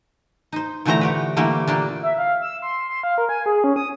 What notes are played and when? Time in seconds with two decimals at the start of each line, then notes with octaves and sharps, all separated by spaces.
0.52 D#4 C5
0.85 A#2 D3 E3 A3 C5 A#5
1.01 F#4 G4 B4
1.36 D3 E3 G3 A3 A#3
1.67 A#2 G3 A#3 D4
2.03 E5
2.18 F5
2.42 E6
2.62 C6
2.89 C6
3.03 F5
3.18 A#4
3.29 G#5
3.46 G#4
3.64 C#4
3.76 D#6